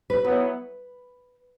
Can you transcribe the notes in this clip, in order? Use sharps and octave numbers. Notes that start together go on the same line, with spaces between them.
B4
F#3 B3 E4 B4